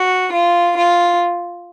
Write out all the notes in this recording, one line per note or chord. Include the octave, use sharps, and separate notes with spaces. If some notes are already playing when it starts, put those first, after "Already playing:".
Already playing: F#4
F4
F4